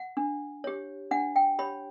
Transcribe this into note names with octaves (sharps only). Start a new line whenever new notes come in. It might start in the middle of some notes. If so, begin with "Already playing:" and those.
Already playing: F#5
D4
G4 C#5
D4 F#5
G5
G4 C#5 B5